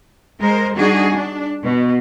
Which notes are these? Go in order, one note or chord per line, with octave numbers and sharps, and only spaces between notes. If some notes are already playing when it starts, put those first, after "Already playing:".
G#3 A#4 C5
G3 D4 D#4 F#4 G#4
D4
B2